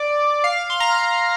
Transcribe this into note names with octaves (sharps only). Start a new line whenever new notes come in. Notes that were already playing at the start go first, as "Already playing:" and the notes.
Already playing: D5
F5
C6
A#5